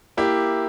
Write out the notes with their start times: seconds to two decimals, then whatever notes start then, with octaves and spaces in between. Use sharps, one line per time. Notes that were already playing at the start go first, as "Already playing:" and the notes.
0.17 A#3 E4 G4